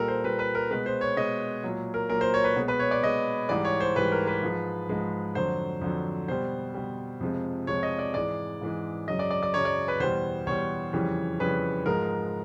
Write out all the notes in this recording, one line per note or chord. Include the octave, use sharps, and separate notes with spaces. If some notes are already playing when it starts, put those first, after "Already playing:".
Already playing: A#2 G3 A4 A#4
C5
A#2 G3 B4
B4
A#4
B2 G#3 B4
C5
C#5
B2 G#3 D#5
A#2 F#3
A#4
A#2 F#3 A#4
C5
C#5
B4
B2 G#3
B4
C#5
D5
B2 G#3 D#5
G#2 E3 G3 D5
C#5
C5
G#2 E3 G3 B4
A#4
B4
G#2 F3 G#3
G#2 F3 G#3
F2 D3 F#3 C5
F2 D3 F#3
B2 G3 C5
B2 G3
F2 C3 F3 G#3
F2 C3 F3 G#3 C#5
D#5
D5
G#2 E3 G#3 D5
G#2 E3 G#3
F#2 C#3 F#3 D#5
D5
D5
D5
F#2 C#3 F#3 C#5
D5
B4
E2 B2 G3 C5
E2 B2 G3 C#5
F2 C#3 E3 G3
F2 C#3 E3 G3 B4
G#2 F3 G#3 A#4